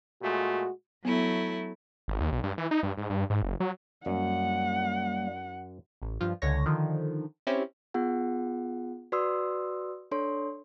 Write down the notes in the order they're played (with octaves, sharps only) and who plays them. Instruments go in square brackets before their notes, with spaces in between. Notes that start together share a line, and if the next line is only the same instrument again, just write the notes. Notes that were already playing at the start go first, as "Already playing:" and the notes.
[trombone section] A#2 G#3 A3 [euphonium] F#4
[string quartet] F#3 A3 E4 [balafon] B3
[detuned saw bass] G#1
D#2
B1
G2
E3
D#4
G2
G#2
G2
G#2
F#1
F#3
[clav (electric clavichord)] F#2 [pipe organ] G3 A#3 [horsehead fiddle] F#5
[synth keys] A1
G2 F3 F4
C#2 D3 C#5 A#6
D3 D#3 F3
C4 C#4 E4 G4
[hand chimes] B3 F4 G#4 F#5
F#4 B4 D5 C6 D#6 E6
D4 A4 C#5 C6